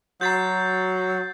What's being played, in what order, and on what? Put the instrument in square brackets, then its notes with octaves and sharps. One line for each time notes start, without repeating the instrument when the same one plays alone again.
[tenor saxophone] F#3 [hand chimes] F#4 A#5 [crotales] G6 A6 C7